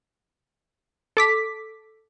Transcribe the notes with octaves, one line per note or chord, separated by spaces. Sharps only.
A4 D6 B6